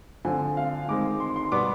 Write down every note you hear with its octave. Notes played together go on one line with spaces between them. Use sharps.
D3 F3 C4 G#5
F5
D#3 G#3 C4 D6
C6
C6
B2 G3 B3 D6